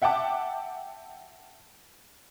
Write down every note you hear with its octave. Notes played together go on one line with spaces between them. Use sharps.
E5 F#5 G5 A5 D6